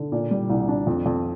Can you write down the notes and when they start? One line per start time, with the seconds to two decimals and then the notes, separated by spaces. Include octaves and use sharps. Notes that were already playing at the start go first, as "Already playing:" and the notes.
Already playing: D3
0.12 A#2
0.31 G3
0.49 C2
0.68 D4
0.87 F2
1.06 F2